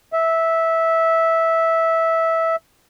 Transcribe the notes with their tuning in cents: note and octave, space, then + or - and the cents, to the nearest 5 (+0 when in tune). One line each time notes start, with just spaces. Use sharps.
E5 -10